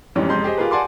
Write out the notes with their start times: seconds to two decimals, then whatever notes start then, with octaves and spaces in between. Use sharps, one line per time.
0.15 F2 G#2 E3 G3 C#4
0.29 F2 C3 G#3 C6 G6
0.44 G4 G#4 C5 D#5
0.57 F4 G4 G#4 A#4 B4
0.71 D5 F#5 G#5 A5 C6 D6